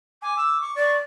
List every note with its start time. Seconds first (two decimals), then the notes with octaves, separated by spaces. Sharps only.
0.22 G#5 D6
0.37 E6
0.61 C#6
0.75 D5